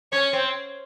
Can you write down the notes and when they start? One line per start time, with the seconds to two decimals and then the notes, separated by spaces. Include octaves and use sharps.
0.13 C#4 C#5
0.33 C4